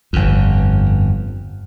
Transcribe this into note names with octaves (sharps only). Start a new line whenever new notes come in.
G1 F2